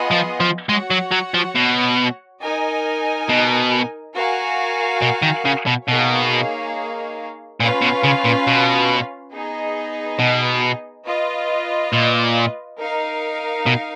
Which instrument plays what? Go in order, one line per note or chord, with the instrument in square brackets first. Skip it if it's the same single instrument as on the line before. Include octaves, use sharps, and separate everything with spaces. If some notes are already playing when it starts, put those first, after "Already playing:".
Already playing: [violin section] B3 F4 G#4 D#5 F#5
[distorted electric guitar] F3
F3
[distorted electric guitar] G#3 [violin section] F#4 C#5 F#5
[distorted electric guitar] F#3
F#3
F3
B2
[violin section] D#4 A#4 D#5 G#5
[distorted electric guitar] B2
[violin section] F#4 A#4 F5 G#5
[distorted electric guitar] B2
D#3
C#3
B2
[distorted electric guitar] B2 [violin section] A#3 D#4 G#4 C#5 F5
[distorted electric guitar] A#2 [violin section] C#4 F4 B4 F5
[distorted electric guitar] B2
C#3
A#2
B2
[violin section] B3 D#4 G#4 D#5
[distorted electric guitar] B2
[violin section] F4 B4 D#5
[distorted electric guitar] A#2
[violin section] D#4 A#4 F5
[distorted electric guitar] B2